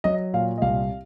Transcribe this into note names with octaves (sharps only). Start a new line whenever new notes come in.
F#3 D#5
A#2 F5
D#5
C2 F5